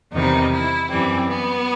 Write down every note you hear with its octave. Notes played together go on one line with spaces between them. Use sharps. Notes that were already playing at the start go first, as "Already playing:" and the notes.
E2 C3 D#3 G3 D#4
E4
F#2 E3 G3 C4
B3